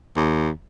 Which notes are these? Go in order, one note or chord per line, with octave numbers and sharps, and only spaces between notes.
D#2